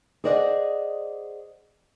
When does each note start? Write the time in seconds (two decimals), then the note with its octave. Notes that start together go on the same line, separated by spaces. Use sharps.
0.24 G#4 C5 D5 D#5 F5 F#5